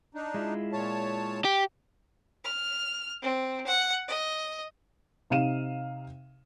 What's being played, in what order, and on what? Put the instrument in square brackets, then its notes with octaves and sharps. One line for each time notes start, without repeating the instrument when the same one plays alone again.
[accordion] D4 D#4
[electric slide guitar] G#3 E4 F4
[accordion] A#2 C#5 A5
[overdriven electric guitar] G4
[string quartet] F6
C4
F#5
D#5
[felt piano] C3 D#4 F5 D#7 E7